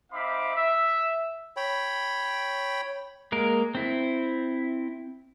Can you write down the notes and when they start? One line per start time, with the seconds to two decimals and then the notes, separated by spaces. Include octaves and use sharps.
0.12 C4 D#4 E5 F5 B5 D6
0.55 E5
1.57 C#5 G5 B5
3.32 G#3 A#3 A#4
3.75 C4 E4